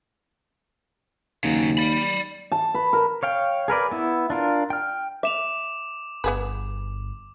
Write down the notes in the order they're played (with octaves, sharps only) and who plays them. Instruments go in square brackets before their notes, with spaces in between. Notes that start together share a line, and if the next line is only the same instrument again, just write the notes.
[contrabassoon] D#2 [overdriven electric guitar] C#3 F#3
[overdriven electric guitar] D5 B5
[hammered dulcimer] A5
B4
A#4
[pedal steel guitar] C#5 F5 G5
G#4 A#4 B4 D5
B3 E4
D4 F4 A#4
G5 F6
[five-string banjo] E5 [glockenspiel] D6 E7 F7
[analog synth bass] G1 [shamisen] B3 G#4 B4